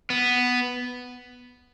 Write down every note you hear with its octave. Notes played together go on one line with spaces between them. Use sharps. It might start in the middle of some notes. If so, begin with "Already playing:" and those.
B3